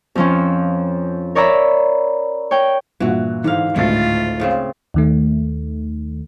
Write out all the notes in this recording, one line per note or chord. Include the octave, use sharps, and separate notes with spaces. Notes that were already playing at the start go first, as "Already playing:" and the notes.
F2 F3 C#4
A#4 C#5 D5 E5 A#5 B5
C#5 G5
G2 A#2 E3 F#4
G#2 D3 E3 F5
G#1 D2 A2 G#3 A3 F4 A6
A2 C#3 C4
D#2 D#3 A3